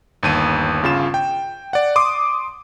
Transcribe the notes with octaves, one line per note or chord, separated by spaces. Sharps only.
G1 D#2 D#7
G1 C#3 F4 E7
G5
D5 F#5
C6 D6 D#6